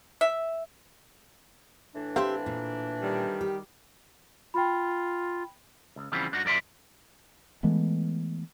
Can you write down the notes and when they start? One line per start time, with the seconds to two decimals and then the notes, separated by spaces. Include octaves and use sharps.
0.21 E5
1.95 A2 E3 D4
2.16 C4 G4 C5 E5 F5
2.46 A#2
3.02 D#3 G3
3.41 G4
4.54 F4 G5 B5
5.96 C#2
6.12 C#3 E3 F3 G3 B3 C4
6.32 G2 D4 D#4 F#4
6.45 F#2 A#4 D5 E5 C6
7.63 E3 G#3 A3 B3